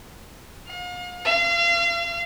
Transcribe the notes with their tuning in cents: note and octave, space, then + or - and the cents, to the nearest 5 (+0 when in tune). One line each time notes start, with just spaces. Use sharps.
F5 +40
F5 -35